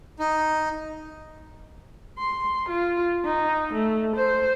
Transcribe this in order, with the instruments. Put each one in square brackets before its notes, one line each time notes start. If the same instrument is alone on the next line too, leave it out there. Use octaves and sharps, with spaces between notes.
[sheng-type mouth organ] D#4
[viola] C6
F4
D#4
A3
C5